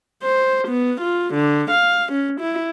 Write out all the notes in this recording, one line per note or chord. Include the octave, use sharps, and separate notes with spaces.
C5
B3
F4
D3
F5
C#4
E4